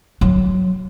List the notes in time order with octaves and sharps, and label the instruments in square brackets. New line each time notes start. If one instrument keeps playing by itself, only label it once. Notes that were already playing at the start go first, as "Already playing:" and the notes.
[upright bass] F#3